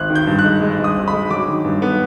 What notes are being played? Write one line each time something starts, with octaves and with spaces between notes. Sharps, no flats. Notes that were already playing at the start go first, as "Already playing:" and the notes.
Already playing: G#1 F#6
D#3
G6
G2
F#6
G#3
G#3
G2
D#6
G#1
B5
G#3
F#3 D6
D#3
G2
B3